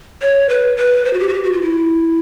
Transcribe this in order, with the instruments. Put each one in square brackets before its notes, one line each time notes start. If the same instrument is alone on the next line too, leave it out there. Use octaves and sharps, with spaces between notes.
[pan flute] C#5
B4
B4
C5
F#4
G4
F#4
G4
F#4
F4
E4